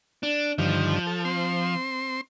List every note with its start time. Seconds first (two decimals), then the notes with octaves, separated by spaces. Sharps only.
0.23 D4
0.58 G2 D3 D#3 F3
1.07 A4
1.25 C4 C6